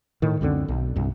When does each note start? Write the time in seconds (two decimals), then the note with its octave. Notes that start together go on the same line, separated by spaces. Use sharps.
0.22 A2 D#3
0.41 C#2 F#2 D3 C4
0.68 B1
0.96 C2 G2